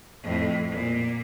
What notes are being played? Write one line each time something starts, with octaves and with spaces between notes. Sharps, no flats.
F2 A2
A#2